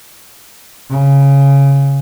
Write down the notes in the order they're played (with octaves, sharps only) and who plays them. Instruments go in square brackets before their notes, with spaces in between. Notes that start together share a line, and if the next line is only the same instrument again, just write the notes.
[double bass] C#3